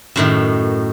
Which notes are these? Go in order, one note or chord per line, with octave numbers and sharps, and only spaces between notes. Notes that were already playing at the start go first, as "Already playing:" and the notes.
F#2 A2 D#3